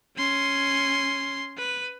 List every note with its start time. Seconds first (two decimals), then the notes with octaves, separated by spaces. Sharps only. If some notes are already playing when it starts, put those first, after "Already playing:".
0.17 C#4 C6
1.58 B4